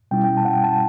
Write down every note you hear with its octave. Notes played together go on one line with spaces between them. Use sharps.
B2 G3 C#4 E4 G5
G5
A5
F#5
G5
A5